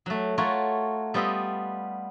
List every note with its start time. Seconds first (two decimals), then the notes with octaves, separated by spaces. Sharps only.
0.06 F#3 A3
0.38 A3 F4 F#4 A#4 C#5
1.14 G3 B3 F4 D#5 E5